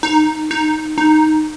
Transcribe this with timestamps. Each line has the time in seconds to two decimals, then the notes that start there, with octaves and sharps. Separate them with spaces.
0.03 D#4
0.51 D#4
0.98 D#4